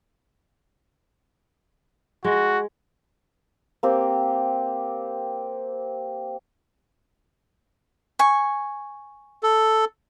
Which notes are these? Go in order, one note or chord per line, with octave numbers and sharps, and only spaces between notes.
G#3 F#4
A#3 C4 G4
G#5 C#6
A4